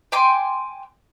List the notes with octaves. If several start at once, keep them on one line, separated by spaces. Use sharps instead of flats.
G5 G#5 C6 D6